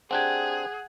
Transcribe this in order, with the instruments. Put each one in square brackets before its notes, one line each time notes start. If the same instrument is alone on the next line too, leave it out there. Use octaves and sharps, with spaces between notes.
[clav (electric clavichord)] C4 D4 G4 [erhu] G#4 [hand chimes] F#5 F#6 G#6